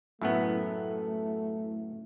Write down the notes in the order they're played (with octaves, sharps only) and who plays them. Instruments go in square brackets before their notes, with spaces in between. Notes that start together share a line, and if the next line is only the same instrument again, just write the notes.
[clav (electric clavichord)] F#2 A2 B3 [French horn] A3 [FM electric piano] E4